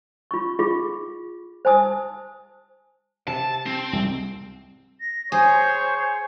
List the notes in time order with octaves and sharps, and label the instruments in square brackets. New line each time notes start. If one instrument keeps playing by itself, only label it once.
[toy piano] F4 C#6
F4 G#4
C5 G#5 A5 D#6
[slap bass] C3 [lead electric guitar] A5
[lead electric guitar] C4
[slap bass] C2 G#2
[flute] A#6
[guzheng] G#4 [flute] C5 [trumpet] C#5